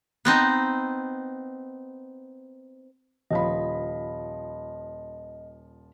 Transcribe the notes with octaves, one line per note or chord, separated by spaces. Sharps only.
B3 C4 D#4
D#1 F3 D#5 B5